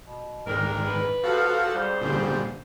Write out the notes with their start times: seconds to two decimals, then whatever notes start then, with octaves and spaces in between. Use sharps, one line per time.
0.07 B2
0.46 C2 G#2 D#3 C4 D4 A#4
0.85 B4
1.24 F3 F#4 A4 F5 F#5
1.74 F2 G#2 G3 C5
2.01 A#2 D3 G3 C#4